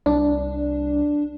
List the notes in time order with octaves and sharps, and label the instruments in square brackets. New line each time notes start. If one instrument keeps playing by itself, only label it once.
[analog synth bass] C2 [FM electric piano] D4